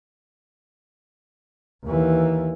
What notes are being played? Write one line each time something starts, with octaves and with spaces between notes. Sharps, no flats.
D#2 E3